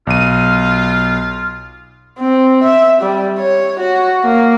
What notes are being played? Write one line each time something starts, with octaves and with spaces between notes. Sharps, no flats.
B1 F4 D#7
C4
E5
G3
C#5
F#4
A#3